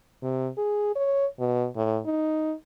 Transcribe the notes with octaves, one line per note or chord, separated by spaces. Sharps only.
C3
G#4
C#5
B2
A2
D#4